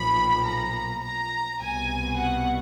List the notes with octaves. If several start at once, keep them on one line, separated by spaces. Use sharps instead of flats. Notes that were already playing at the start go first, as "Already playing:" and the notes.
Already playing: B1 A#2 F3 B5
A#5
A#5
C2 B2 G#5
F#5